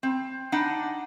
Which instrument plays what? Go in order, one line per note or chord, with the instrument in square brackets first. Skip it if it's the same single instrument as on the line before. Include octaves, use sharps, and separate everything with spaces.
[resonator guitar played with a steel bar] C4
D4 D#4 F#5